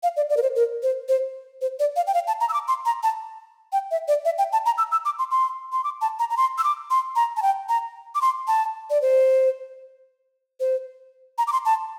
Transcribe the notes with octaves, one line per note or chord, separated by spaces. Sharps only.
F5
D5
D5
A#4
C5
A#4
C5
C5
C5
D5
F5
G5
F5
A5
A#5
E6
D6
C6
A#5
A5
G5
E5
D5
E5
G5
A5
A#5
E6
E6
D6
C6
C6
C6
D6
A5
A#5
A#5
C6
E6
D6
C6
A#5
A5
G5
A#5
D6
C6
A5
D5
C5
C5
A#5
D6
C6
A5